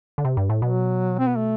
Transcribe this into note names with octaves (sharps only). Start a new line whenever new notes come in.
D3
C3
G2
A2
B2 F#3
C4
B3
A3